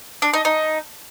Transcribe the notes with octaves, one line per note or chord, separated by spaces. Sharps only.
D4
D#4
D#4